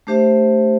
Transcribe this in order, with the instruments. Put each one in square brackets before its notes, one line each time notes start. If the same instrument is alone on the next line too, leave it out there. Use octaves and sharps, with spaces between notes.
[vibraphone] A3 D4 G4 C5 E5